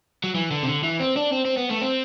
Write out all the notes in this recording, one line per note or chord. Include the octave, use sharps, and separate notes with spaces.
F#3
E3
D3
C3
D3
E3
C4
D4
C4
C4
B3
A3
C4